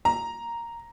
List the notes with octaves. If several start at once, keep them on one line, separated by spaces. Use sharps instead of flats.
A#5